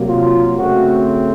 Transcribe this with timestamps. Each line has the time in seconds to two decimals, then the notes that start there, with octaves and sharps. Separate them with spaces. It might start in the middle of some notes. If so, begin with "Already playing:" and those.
Already playing: C3 F#3 A#3
0.08 F4
0.57 C#3 A3 C4 F#4